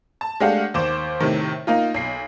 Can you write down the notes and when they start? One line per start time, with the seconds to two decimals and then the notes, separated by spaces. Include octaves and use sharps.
0.21 A5
0.40 G#3 A3 D4 G4 F5 F#5
0.74 D#2 C5 D6 E7
1.20 A2 C3 D#3
1.67 A#3 D#4 F4
1.94 B1 C7